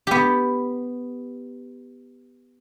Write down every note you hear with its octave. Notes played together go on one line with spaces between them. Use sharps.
B3 G4